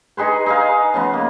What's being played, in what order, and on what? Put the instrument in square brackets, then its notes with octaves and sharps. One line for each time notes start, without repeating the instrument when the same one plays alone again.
[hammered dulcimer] D#4 G#4 B4 C5
D#4 G#4 F5
C#3 F3 B3
A#3